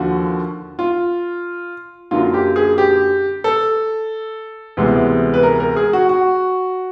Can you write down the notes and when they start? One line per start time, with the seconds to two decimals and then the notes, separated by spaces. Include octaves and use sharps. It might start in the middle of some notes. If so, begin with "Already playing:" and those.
Already playing: D#2 D3 F3 F#4
0.79 F4
2.11 F#2 D3 F#3 A#3 F4
2.34 G4
2.56 G#4
2.78 G4
3.44 A4
4.77 D2 C3 E3 G#3 B3
5.34 B4
5.43 A#4
5.60 A#4
5.77 G#4
5.93 F#4
6.09 F#4